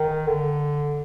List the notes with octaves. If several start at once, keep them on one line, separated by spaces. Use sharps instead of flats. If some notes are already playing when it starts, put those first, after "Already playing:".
Already playing: D#3
D3